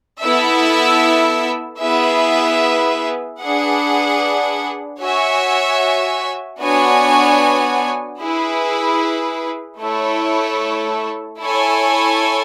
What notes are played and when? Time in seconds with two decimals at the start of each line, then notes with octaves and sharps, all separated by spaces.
0.20 B3 E4 A4 E5
1.80 B3 E4 G#4 B4 E5
3.40 D4 G#4 B4 F#5
5.01 F#4 C#5 E5 G#5
6.60 B3 D4 F#4 C#5 G#5
8.20 E4 G#4 B4
9.79 A3 E4 A4 C#5
11.39 E4 A4 C#5 G#5